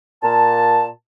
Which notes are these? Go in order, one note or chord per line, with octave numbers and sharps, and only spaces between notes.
A#2 A5